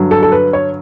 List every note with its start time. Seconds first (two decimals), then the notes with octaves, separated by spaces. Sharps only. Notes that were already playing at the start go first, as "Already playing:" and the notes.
Already playing: G2 D3 F#3
0.11 A4
0.23 A4
0.32 B4
0.53 C#5